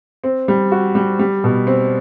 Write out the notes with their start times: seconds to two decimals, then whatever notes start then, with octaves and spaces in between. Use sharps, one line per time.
0.24 C4
0.48 G3
0.72 F#4
0.95 G3
1.19 G3
1.44 B2
1.67 C4